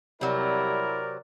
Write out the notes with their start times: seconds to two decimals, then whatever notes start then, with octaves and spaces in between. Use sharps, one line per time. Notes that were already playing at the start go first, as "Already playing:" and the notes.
0.21 C3 F#3 G3 E4 A#4 D5